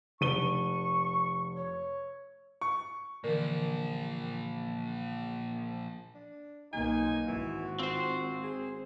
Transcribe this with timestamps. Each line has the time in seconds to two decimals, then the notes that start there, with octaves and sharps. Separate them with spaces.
0.21 F1 C#6 D#7 G7
1.55 C#5
2.61 C#6
3.24 A#2 D3 E3 F3 A#4
6.15 D4
6.73 B1 A#3 D#4 G#5
7.27 G#1 E3 F#4
7.79 C4 F4 C5
8.43 G#4